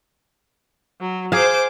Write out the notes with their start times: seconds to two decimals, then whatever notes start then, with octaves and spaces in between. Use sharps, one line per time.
1.01 F#3
1.32 G#4 C5 F5 D6